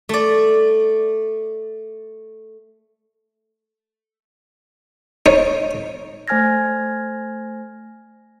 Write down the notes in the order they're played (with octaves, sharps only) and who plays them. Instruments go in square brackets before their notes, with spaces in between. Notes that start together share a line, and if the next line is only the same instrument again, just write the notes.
[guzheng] A3 D5
[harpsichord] D#4 C#5
[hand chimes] A3 C5 G#5 F6 G#6 A#6